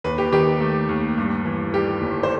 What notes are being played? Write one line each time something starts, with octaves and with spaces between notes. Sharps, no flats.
D#2 B4
G4
D#3 G4
A3
D#2
G2
E3
G3 G4
G1
C5